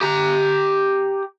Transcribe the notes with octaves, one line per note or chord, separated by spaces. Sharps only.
G4 A#5